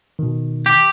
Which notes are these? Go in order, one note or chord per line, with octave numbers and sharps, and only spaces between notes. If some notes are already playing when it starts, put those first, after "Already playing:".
B2 D#3
G4